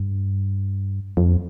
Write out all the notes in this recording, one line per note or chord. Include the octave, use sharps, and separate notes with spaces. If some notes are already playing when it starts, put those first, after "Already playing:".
Already playing: G2
F2